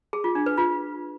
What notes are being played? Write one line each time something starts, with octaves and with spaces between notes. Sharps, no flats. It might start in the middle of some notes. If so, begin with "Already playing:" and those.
G#4
F4
D4
B4
F4